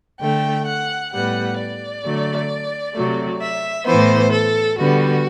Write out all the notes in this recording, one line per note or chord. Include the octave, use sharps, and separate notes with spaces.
D3 A3 G5
F#5
A2 G3 B3 F#5
D5
D3 F#3 A3
C3 F#3 A3
E5
A2 E3 B3 C5
A4
D3 G3 B3 F#4